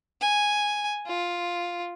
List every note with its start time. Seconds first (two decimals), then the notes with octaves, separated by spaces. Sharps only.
0.21 G#5
1.06 F4